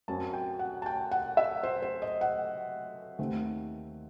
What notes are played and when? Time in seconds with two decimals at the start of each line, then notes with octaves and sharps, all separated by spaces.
0.08 F#2 F#3 C4 A5
0.33 G5
0.59 F#5
0.82 A5
0.86 G5
1.11 F#5
1.37 E5
1.63 C5
1.82 C5
2.02 D#5
2.21 F#5
3.19 D#2 D#3 A3 C4